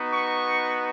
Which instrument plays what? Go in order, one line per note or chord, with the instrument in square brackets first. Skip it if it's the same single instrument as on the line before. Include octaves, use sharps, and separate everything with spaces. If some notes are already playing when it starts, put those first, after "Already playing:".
Already playing: [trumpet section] B3 D#4 F#4
C#6